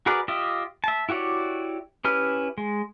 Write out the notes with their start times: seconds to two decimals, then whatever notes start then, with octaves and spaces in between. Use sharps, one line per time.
0.06 F#4 G#4 A#4 B4 D5
0.28 F4 G4 D#5 E5
0.84 E5 A5
1.09 E4 F#4 G4 C#5 D5
2.05 C#4 E4 G4 B4 F6
2.58 G#3